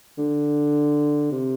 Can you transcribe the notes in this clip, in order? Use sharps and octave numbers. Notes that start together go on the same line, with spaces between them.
D3
C3